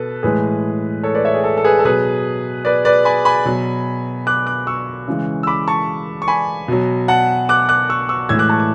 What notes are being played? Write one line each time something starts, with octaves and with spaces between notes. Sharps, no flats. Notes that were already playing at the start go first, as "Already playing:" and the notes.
Already playing: B2 A4 B4
A2 E3 G#3 G#4 B4
A4 C#5
B4 D5
C#5 E5
G#4
A4
A4
G#4 B4
A4
B2 F#3 G#4 B4
B4 D5
B4 D5
G#5 B5
G#5 B5
B2 F#3
D6 F#6
D6 F#6
C#6 E6
C#3 E3 G#3
E6
B5 D6
A5 C#6
C#6
G#5 B5
B2 F#3
F#5 A5
D6 F#6
D6 F#6
C#6 E6
C#6 E6
A2 E3 G#3 E6 G#6
D6 F#6
A5 C#6
D6